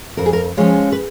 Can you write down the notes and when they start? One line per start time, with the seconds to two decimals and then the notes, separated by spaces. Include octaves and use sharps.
0.17 F2 A#4
0.26 G#4
0.33 A#4
0.57 F3 G#3 C#4 C#5
0.92 B4